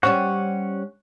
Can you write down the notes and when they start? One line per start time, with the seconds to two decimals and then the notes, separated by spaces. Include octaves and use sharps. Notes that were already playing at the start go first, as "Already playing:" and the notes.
0.03 G3 C#4 C5 F#5 C#6